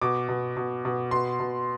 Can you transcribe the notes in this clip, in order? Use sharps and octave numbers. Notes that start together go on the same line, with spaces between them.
B2 D6
B2
B2
B2
B2 C6
B2